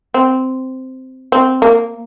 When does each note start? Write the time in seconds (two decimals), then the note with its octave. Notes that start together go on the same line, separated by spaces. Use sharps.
0.14 C4
1.32 C4
1.62 A#3